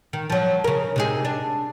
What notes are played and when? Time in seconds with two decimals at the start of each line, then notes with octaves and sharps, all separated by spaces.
0.13 D#3
0.30 F3 F#3
0.64 C#3 A#4
0.96 C3 D#4 G#4
1.25 D4